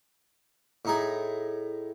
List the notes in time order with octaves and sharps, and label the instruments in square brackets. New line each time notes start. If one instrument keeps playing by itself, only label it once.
[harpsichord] A2 D#4 G#4